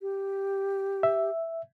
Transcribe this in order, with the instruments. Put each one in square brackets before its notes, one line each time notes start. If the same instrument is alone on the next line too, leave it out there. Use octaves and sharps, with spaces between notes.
[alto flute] G4
[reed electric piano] E5